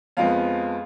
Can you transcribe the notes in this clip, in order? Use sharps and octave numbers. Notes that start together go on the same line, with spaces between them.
F2 F3 G#3 B3 F5